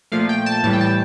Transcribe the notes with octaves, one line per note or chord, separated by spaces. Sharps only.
A#2 F3 A3 F5
G5
A5
A2 E3 G3 A5
G5
A5